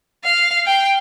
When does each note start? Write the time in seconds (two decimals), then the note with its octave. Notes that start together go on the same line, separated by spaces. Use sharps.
0.24 F5
0.66 G5